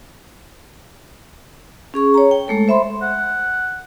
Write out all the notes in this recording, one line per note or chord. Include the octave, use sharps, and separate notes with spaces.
C#4 G#4 C#6
C#5 A#5
G5
G#3 A3 A4
C5 E5 B5 C6
F#5